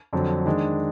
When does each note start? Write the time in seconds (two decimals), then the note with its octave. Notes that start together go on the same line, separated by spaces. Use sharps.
0.13 F2 D3 F#3 D4
0.46 D#3 G#3 D4